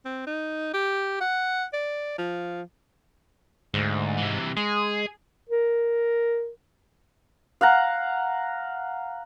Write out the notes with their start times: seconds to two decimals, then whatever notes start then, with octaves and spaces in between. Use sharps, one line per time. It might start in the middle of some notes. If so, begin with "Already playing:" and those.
0.05 C4
0.27 D#4
0.74 G4
1.21 F#5
1.73 D5
2.18 F3
3.74 D2 G#2
4.18 C3 E3
4.57 G#3 G#4
5.49 A#4
7.61 F5 F#5 A#5